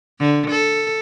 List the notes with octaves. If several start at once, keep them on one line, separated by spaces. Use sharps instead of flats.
D3
A4